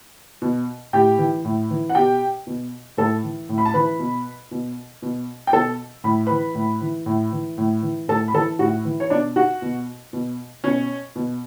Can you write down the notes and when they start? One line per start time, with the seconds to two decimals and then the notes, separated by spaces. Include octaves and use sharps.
0.42 B2
0.93 A2 G4 G5
1.18 E3
1.45 A2
1.71 E3
1.89 F#5
1.95 B2 G4 G5
2.47 B2
2.97 A2 A4 A5
3.24 E3
3.49 A2
3.58 B5
3.65 A5
3.74 E3 B4 B5
3.99 B2
4.51 B2
5.02 B2
5.47 G5
5.53 B2 A4 A5
6.04 A2 B5
6.26 E3 B4 B5
6.55 A2
6.81 E3
7.06 A2
7.32 E3
7.58 A2
7.83 E3
8.08 A2 A4 A5
8.28 B5
8.34 E3 A4 A5
8.59 A2 F#4 F#5
8.85 E3
9.00 C#5
9.10 B2 D4 D5
9.36 F#4 F#5
9.62 B2
10.13 B2
10.64 B2 C#4 C#5
11.16 B2